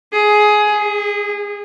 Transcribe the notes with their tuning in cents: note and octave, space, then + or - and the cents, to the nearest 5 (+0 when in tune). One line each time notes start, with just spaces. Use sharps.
G#4 +15
G#4 -25